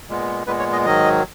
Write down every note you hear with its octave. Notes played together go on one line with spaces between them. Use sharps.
A#2 G#3 B3
A#2 G#3 B3 B4
C#5
D#5
G#2 D#3 F#3 D#5